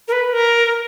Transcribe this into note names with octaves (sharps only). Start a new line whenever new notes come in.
A#4
B4
A#4